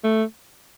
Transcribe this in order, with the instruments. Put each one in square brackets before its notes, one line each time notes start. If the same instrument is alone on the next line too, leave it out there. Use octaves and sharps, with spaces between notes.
[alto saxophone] A3